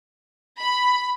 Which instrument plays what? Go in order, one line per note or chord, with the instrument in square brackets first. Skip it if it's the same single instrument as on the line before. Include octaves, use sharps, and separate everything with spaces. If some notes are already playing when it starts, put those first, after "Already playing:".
[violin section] B5